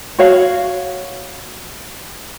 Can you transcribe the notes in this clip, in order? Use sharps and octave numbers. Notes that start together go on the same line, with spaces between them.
F#4 C#5 F5